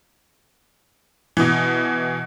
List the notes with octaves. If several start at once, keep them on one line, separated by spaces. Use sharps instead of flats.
B2 E3